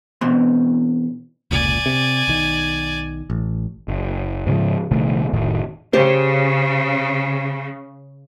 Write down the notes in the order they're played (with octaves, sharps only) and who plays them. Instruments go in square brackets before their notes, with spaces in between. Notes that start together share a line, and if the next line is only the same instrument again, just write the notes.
[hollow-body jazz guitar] B2 E3 B3 C4 C6
[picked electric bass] F1 C#2 A#2 [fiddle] D5 G#5
[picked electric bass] C3
B1 D#3
A1
F#1
G#2 C#3 E3 F3
A#1 C3 D#3 A3
F1 A2 D#3
[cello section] C#3 [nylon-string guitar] G4 C5